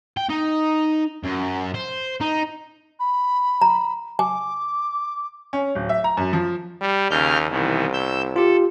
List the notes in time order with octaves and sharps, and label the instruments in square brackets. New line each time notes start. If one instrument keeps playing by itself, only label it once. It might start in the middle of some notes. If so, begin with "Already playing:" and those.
[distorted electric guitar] G5
D#4
F#2
C5
D#4
[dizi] B5
[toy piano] A#5
[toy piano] G#5 [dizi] D6
[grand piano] C#4
D1
E5
A#5
F#2
F3
[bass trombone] G3
[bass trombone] D#2 [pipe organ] C#3 F6 G6
[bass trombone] C2 [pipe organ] B2 D#3 E3
[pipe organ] E6 G6
[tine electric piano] F4 G4 [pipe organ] A4